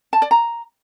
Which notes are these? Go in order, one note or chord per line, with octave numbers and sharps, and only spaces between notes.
A5
D5
A#5